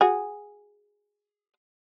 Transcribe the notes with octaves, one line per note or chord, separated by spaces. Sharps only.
F#4 G#4